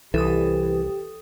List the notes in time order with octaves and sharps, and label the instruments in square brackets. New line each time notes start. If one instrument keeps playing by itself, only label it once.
[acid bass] C2 [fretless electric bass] E3 [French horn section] G4 [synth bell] A4 D#6